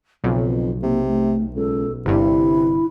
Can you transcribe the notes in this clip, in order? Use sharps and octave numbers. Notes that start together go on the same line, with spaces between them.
B1 F2 C#3
C3 A#3
A3
C#2 A4
G1 G2 C3 E4